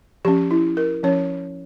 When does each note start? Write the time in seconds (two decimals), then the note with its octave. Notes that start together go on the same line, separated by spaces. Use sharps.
0.25 F3 C#4 G4
0.51 E4
0.77 A#4
1.03 F3 C#4 C#5